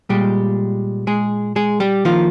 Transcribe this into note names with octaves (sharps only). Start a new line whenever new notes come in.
A#2 G3 G#3 G4
G#3 G#4
G#3 G#4
G3 G4
D#3 F3 A#3 F4